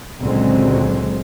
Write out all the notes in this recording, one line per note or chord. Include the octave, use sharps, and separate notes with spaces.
C#2 A#2 D3 F#3 G#3 C4